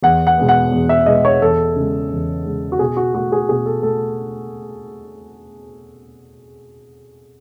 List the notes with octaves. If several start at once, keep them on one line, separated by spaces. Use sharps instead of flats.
E2 F#5
F#5
B2 G#3 B3
F#5
E2
E5
B2 G#3 B3 D#5
C#5
E2 A4
C#3 G#3
E2
C#3 G#3
F#4
B2 G#4
F#4
A3 F#4
G#4
B2 G#4
A4
A3 A4